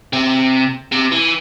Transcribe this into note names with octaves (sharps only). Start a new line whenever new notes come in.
C3
C3
E3